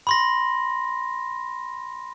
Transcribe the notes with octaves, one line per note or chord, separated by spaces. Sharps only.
B5 C6 A#6